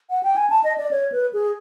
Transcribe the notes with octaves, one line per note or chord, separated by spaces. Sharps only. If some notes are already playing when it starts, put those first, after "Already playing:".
F#5
G5
G#5
A5
D#5
D5
C#5
B4
G#4